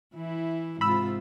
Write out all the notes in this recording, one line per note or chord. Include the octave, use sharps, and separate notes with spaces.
E3 E4
G#2 C3 F4 B5 E6